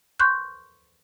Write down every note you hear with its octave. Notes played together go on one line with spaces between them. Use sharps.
C6 C#6 F#6 G6